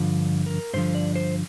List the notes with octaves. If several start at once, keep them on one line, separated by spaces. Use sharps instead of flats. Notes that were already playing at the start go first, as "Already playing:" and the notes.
Already playing: G2 D3 F3
A#4
G2 D3 F3 C5
D5
C5